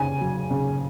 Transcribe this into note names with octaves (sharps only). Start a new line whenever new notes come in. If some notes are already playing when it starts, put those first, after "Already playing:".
Already playing: C#3 G#5
F#3
C#3